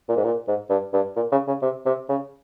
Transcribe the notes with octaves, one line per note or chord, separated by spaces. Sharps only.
A#2
G#2
A#2
G#2
G2
G2
A#2
C#3
C#3
C3
C3
C#3